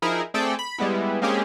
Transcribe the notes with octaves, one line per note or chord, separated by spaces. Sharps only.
F3 D#4 E4 G#4 A#4
A3 C4 G#4 A4 D5 G5
B5
G3 G#3 B3 E4
G#3 A#3 C4 C#4 G4 G#4